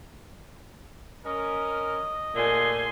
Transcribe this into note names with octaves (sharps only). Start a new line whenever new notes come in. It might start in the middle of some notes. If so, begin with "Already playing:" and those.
C#4 A#4 D#5
A#2 A3 G4 G#4 G#5 C6